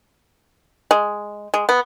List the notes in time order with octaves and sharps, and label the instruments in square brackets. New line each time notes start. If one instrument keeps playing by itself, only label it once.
[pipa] G#3
G#3
B3